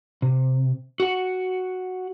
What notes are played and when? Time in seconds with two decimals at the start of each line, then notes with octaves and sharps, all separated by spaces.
0.22 C3
1.00 F#4 F#5